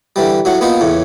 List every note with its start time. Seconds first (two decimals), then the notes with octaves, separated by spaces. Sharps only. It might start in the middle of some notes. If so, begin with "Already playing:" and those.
0.16 D3 E3 G3
0.45 A2 F#3 F#4
0.61 A#3 B3 D#4 F4
0.80 E2 A2 C#3